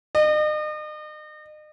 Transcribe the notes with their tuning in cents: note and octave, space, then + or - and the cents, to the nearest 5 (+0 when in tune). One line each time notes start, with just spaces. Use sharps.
D#5 -40